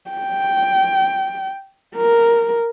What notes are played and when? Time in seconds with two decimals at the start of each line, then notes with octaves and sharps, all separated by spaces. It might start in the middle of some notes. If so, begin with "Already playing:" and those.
0.10 G5
1.96 A#4